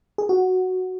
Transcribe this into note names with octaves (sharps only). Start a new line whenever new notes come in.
G#4
F#4